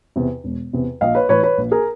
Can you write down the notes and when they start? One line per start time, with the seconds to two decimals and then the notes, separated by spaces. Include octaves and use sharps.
0.16 E2 C3
0.44 E1
0.73 E2 C3
1.01 A#1 D#5 F5
1.15 B4 C#5
1.29 A2 E3 B4 C#5
1.43 B4 C#5
1.58 A#1
1.71 G#4 A#4